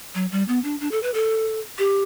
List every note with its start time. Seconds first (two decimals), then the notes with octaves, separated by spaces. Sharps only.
0.15 F#3
0.32 G3
0.48 B3
0.64 D4
0.81 D4
0.92 A4
1.03 B4
1.14 A4
1.78 G4